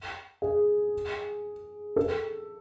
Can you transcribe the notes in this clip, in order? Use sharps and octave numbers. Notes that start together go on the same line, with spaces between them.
G#4
A4